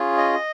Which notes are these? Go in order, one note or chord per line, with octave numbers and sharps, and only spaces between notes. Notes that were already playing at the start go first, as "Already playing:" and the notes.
Already playing: C#4 F4 G#4
D#5